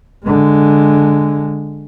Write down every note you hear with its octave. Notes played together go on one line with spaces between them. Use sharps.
D3 G#3